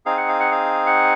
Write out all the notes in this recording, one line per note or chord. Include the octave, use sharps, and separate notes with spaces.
C4 D#4 G#4 F5
F#5
F5
F#5
F5
F#5